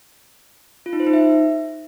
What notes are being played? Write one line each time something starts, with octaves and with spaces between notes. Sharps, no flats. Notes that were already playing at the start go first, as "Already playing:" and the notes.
F4
D#4
C5
D#4
E5